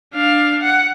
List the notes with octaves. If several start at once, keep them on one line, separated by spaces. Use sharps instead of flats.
D4 F5
F#5